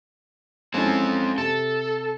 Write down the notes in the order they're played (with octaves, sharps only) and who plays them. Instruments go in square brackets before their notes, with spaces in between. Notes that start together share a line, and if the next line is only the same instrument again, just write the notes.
[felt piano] G#3 C#4 E4 [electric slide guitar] C4 A4
[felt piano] C3 [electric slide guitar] A4